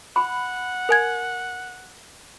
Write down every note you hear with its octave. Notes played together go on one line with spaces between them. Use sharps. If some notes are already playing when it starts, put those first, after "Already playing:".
F#5 B5
A#4 G#5 G#6